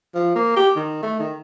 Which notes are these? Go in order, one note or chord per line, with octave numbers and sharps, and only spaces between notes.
F3
A#3
G4
D#3
A3
D#3